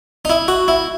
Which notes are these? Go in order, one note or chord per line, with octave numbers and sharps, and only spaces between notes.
D#4
E4
F#4
E4